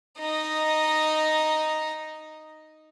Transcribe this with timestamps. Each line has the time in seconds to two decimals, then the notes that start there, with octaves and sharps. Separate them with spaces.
0.19 D#4 D#5